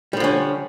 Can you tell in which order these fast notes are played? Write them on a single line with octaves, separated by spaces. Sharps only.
G3 F3 D3 C#4